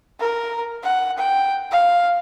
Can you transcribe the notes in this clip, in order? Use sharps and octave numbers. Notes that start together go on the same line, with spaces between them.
A#4
F#5
G5
F5